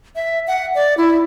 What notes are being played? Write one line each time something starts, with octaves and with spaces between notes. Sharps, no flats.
E5
F#5
D5
E4